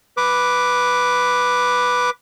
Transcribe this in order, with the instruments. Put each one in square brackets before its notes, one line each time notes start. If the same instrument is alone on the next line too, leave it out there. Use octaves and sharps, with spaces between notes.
[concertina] B4 D6